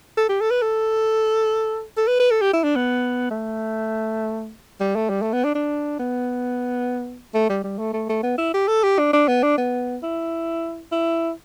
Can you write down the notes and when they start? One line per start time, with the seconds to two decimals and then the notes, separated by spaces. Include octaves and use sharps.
0.17 A4
0.29 G4
0.41 A4
0.51 B4
0.62 A4
1.97 A4
2.08 B4
2.20 B4
2.31 A4
2.42 G4
2.53 E4
2.64 D4
2.76 B3
3.31 A3
4.81 G3
4.96 A3
5.10 G3
5.22 A3
5.33 B3
5.44 D4
5.55 D4
5.99 B3
7.34 A3
7.50 G3
7.64 G3
7.78 A3
7.93 A3
8.09 A3
8.23 B3
8.38 E4
8.54 G4
8.68 A4
8.84 G4
8.99 D4
9.13 D4
9.28 B3
9.43 D4
9.58 B3
10.03 E4
10.92 E4